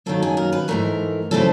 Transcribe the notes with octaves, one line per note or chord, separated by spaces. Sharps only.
F#2 D#3 F#3 A#3 A4
G#4
A#4
B4
G#2 E3 A3 A#4
C#3 E3 A3 C4 A4